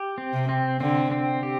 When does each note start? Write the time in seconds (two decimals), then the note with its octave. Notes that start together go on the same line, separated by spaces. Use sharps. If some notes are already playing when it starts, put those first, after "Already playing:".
Already playing: G4
0.18 C4
0.33 C3
0.49 C4
0.80 D3 C4
1.12 C4
1.43 G4